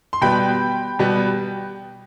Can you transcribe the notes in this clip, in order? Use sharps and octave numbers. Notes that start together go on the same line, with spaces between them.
C6
B2 G3 B3 G5 B5
B2 G3 B3